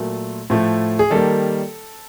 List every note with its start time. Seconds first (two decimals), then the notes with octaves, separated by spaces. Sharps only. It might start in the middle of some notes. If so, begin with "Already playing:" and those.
Already playing: A#2 F#3 A3
0.50 A2 F3 A3
0.99 G#4
1.10 D#3 G3 A#3 A4